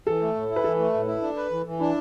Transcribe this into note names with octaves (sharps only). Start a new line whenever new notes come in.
E3 A4
A3
A2
E4
B4
E3 A4
A3
A2
E4
D4
B4
E3
E3
D4 E4